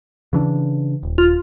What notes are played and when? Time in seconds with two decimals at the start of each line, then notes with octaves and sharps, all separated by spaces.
0.33 C#3 E3 D4
1.03 D#1
1.18 F4